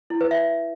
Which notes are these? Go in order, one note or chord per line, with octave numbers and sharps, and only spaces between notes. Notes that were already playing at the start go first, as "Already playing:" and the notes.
E4
B4
E5